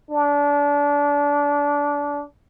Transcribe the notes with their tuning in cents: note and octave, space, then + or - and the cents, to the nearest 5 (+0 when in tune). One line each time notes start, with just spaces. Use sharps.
D4 -25